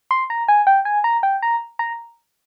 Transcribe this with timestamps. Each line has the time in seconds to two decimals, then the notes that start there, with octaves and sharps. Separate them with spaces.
0.11 C6
0.30 A#5
0.48 G#5
0.67 G5
0.85 G#5
1.04 A#5
1.23 G5
1.42 A#5
1.79 A#5